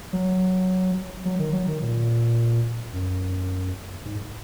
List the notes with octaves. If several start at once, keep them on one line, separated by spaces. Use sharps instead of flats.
F#3
F#3
D#3
F#3
D#3
A#2
F#2
G#2